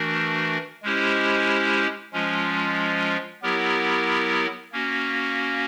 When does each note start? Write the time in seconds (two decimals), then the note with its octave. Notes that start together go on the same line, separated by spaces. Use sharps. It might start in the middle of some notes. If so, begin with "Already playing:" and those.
Already playing: E3 A3 D4 F#4 A#4
0.83 G#3 C#4 E4 G4 C5
2.13 F3 G#3 C#4 F4
3.43 F#3 B3 E4 G4 A#4
4.72 A#3 C#4 F#4